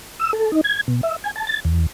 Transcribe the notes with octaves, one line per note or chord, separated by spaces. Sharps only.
E6
A4
D#4
G#6
B2
E5
G#5
A5
A6
E2